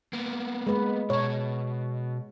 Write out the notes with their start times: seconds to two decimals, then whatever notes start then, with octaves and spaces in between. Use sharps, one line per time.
0.13 A#3 B3
0.67 G#3 B4
1.10 B2 C#5 A5